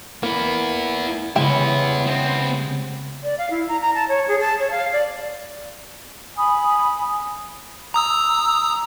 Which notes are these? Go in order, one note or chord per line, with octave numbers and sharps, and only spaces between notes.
A#3 B3 E4
C#3 G#3 B3 E4 G4 E5 G5
B3 C4
D5
F5
E4
A#5
A#5
A5
C#5
G#4
A5
C#5
F5
D5
G#5 B5 D#6
A#5 D#6 E6